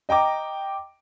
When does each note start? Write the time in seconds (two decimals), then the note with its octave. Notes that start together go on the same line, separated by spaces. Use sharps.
0.09 D#5 G5 A#5 D6